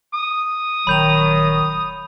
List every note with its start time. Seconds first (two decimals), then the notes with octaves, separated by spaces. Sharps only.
0.14 D#6
0.87 D#1 D#3 F#3 B5 G6 F7